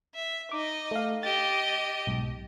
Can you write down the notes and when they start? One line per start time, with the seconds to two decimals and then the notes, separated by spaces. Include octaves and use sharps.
0.15 E5
0.52 D#4 D#5 D6
0.91 A3 F5
1.23 G4 D#5 A6
2.07 B1 G#2